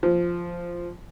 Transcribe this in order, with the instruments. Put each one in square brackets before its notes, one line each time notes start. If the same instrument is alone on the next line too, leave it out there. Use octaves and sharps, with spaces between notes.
[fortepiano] F3